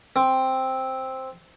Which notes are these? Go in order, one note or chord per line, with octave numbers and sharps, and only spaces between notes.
C4